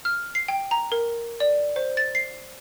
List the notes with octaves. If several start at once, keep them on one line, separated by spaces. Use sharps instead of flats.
F6
C7
G5
A#5
A#4
D5
C5
A6
C7